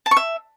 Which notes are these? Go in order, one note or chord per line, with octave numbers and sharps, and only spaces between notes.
A5
C#6
E5